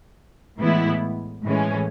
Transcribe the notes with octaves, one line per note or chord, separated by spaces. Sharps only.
A2 E3 G#3 B3 E4
A2 E3 G#3 C#4